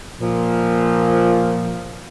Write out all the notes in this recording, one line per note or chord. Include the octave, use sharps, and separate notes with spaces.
A#2 F3